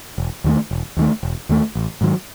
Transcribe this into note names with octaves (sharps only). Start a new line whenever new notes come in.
E1
D#2 D#3 A3
E1
D#2 D#3 A3
E1
D#2 D#3 A3
A1
G#2 D#3 F#3